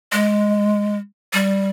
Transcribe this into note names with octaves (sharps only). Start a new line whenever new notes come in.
G#3
G3